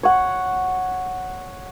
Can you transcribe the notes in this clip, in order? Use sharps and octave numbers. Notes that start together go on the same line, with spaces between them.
C#5 F#5